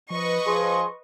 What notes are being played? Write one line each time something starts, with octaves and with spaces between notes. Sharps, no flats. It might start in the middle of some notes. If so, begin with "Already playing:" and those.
F3 B4 D#5 C#6
F3 G#4 C6